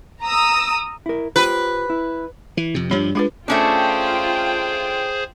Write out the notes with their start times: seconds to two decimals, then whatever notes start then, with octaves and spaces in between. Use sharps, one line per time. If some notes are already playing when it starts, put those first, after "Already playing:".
0.22 A#5 D#6 E6
1.06 E4 A#4
1.36 F4 G4 B4 C5
1.90 E4
2.57 E3
2.74 F2 C3
2.91 G2 F3 D4 G4 C#5
3.15 G#3 D4 F4 B4
3.48 A3 C#4 D4 F4 G#4 C5 G5